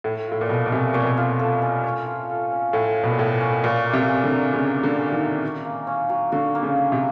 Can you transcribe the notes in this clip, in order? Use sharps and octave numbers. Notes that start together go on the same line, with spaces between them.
A2 C#5
A2 F4
A#2
B2 A4
B2
C3 C#4
A#2 C#5
B2
A#2
F4
A4
C#4
C#5
F4
A4
C#4
A2 C#5
F4
B2
A#2
A2 A4
C#4
A#2 F#4
A#3
C3
C#4
D3
F#3
C#3 F#4
A#3
D3
C#4
D#3
F#3
F#4
A#3
C#4
F#3
D3 F#4
A#3
C#3
C#4
C3